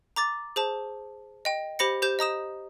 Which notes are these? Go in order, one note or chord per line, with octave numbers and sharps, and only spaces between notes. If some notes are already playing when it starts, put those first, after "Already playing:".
A#5 D6 A6
G#4 C5 A5
D#5 G5
G4 C5 B5 A#6 C#7
G4 C5 G6 E7
D#5 A#5 D#6 E7